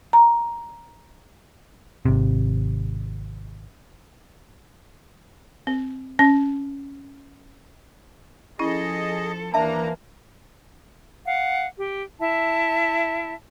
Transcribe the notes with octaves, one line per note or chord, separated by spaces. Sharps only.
A#5
G#1 C3
C4
C#4
F3 C#4 E4 G#4 A4 D#5
D#2 E3 A#3 D4 E5 A5 A#5
F5 F#5
G4
E4 E5 A5